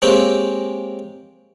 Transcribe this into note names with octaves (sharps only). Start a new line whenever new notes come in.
G#3 A#3 C4 C#4 G4